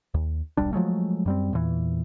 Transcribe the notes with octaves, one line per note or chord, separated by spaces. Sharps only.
D#2
D#1 B1 G3 D4
F3 F#3 G#3 A3
F#2 G3 C4
E2 A#2 E3